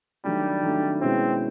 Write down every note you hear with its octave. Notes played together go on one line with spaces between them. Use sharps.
D#3 F#3 G3 A3 D4
D#3 F#3 A3 D4
B2 G#3 C4 C#4 E4